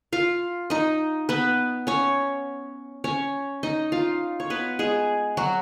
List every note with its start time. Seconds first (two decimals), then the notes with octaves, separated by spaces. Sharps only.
0.13 F4 F5
0.70 D#4 D#5
1.29 B3 B4
1.87 C#4 C#5
3.04 C#4 C#5
3.63 D#4 D#5
3.92 F4 F5
4.40 C#5
4.50 B3 B4
4.79 G#3 G#4
5.37 F#3 F#4